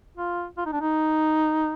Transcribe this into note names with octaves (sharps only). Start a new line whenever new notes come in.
F4
F4
D#4
D4
D#4